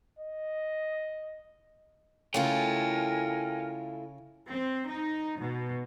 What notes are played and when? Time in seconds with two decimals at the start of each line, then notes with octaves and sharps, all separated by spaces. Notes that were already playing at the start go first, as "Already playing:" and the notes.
0.19 D#5
2.34 C#3 A3 E4 F4 A#4 F5 G5 G#5
4.51 C4
4.89 D#4
5.39 B2